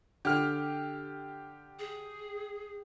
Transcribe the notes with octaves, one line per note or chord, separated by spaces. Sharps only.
D3 G4 F6
G#4